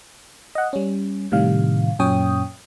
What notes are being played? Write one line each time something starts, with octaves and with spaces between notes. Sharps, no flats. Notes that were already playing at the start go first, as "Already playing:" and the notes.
D#5 F#5
G3 C#4
A2 C3 D#3 G3 F5
F#2 A#2 C#4 C#5 G5 D#6